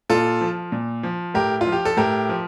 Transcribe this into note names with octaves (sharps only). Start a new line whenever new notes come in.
A#2 F4 A4
F3
A#2
F3
A2 G4 A#4
F4
F3
G4
A4
A2 G4 A#4
F3